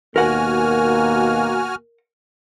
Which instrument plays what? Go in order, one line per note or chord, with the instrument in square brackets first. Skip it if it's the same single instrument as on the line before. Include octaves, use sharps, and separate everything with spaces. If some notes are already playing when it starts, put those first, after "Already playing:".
[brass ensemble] D#2 B2 A#3 [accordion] F#4 G#5 F6 [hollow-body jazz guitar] A#4 F#5